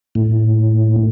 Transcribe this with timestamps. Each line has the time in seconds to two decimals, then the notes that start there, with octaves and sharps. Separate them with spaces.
0.15 A2